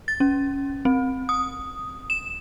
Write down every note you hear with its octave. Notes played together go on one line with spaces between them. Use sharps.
A6
C#4
C4
D#6
E7